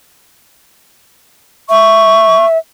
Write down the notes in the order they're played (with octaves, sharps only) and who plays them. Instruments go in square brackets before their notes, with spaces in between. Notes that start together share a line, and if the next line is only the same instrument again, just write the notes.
[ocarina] E5 [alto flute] C#6